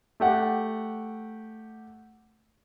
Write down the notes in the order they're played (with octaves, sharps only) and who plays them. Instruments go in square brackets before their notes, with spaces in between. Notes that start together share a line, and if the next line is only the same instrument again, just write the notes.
[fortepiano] A3 G4 F#5